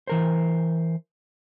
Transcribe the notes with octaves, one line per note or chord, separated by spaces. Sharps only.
E3 A#4 C5